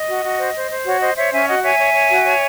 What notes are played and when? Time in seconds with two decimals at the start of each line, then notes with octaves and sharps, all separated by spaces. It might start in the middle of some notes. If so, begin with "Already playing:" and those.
Already playing: D#5
0.08 F#4
0.24 F#4
0.39 C5
0.55 C5
0.71 C5
0.86 F#4 C#5
1.01 C5 D#5
1.17 C5 C#5 E5
1.32 C#4 E5 G#5
1.48 F#4 D#5 F#5
1.63 C#5 E5 G#5
1.79 C#5
1.94 C#5
2.09 F#4
2.26 C#5